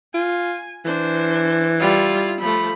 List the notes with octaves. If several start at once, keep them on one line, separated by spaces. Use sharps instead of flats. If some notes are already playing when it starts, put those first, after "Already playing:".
F4 G#5
E3 D4 C5
G3 E4 F4
F3 A3 B5